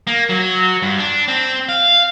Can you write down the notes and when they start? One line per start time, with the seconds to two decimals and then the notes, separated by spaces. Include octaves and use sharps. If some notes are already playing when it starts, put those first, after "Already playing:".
0.07 A#3
0.30 F#3
0.82 G2
0.99 D4
1.28 C4
1.69 F5